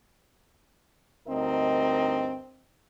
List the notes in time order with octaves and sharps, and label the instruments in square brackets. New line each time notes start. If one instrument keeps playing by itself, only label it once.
[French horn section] D2 G2 C4 D#4 A#4 D#5